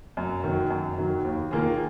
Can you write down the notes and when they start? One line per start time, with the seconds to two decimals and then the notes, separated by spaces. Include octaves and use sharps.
0.17 F#2
0.44 D#3 F#3
0.70 F#2
0.98 D#3 F#3
1.24 D#2
1.51 D#3 A#3 F4 G#4